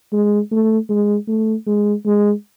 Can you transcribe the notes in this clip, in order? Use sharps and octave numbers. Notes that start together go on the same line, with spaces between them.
G#3
A3
G#3
A3
G#3
G#3